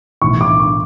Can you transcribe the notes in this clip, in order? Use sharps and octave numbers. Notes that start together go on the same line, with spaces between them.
B1 A2 E3 C#6
D6
C#6